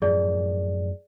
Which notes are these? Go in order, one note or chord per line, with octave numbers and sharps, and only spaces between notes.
F#2 A2 F3 G#4 D5